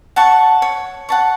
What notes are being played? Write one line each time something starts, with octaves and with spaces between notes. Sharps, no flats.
F#5 A5 C#6
C#5
F#5 A5 C#6